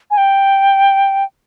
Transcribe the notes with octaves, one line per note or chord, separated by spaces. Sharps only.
G#5
G5